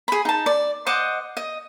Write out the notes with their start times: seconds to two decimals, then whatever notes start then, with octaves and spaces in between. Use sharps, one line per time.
0.08 G#4 B5
0.25 D#4 A5
0.46 D5
0.87 C5 D#5 F#5 D6
1.37 D#5